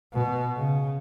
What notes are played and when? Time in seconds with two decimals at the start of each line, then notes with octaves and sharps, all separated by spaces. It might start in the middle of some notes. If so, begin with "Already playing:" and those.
0.13 B2
0.57 C#3